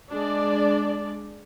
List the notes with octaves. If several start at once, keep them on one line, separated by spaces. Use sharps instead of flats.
G#3 D4 D5